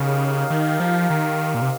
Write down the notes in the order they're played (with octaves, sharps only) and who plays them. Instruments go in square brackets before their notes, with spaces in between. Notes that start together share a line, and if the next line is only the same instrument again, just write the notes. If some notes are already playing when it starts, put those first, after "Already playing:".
Already playing: [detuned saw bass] C#3 [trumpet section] D#4 G4 A#4 F5
[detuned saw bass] D#3
F3
D#3
A#2
C3